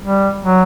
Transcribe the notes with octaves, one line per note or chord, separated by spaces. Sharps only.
G3
F#3